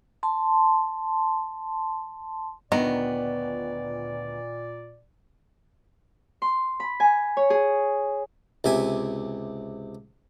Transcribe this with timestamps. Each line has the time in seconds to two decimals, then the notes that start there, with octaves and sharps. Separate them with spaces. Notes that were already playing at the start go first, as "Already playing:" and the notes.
0.23 A5 C6
2.72 D2 A#2 D#3 B3 D5 A#5
6.42 C6
6.80 B5
7.00 G#5
7.37 C#5
7.50 G#4
8.64 C#2 C3 E5 G#5